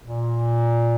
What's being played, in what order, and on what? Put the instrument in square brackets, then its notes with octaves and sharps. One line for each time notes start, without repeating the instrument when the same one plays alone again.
[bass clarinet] A#2